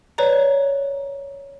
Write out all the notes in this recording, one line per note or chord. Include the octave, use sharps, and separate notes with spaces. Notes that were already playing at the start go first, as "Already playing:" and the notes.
B4 C#5 D5 A#5